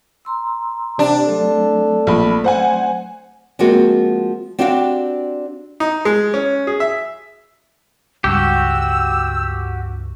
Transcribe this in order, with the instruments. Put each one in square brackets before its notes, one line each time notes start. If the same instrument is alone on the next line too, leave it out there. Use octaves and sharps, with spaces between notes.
[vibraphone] A#5 C6 E6
[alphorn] C3 [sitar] D4
[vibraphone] F#3 A3 C4 [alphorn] A4
[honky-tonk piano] A#1 B5
C5 F#5 G#5
[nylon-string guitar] F3 G#3 A#3 C4 F#4
C4 D4 F#4 G4 F5 G5
[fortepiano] D#4
G#3
C#4
G#4
E5
[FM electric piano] C#2 G2 [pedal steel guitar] F#4 G4 [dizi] E6